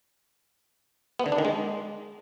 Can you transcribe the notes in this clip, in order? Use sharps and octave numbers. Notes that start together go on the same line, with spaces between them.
B3
D3
D4
D#3
G#3